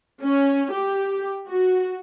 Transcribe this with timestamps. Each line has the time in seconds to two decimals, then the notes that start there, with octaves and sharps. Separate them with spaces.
0.20 C#4
0.71 G4
1.46 F#4